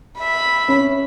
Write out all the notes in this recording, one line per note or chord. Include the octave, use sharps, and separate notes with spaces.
E5 B5
C#4